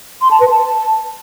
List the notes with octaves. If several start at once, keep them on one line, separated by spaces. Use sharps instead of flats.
C6
A5
B4
A5